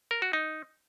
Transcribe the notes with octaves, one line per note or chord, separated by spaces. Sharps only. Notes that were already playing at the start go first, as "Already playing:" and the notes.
A#4
F#4
D#4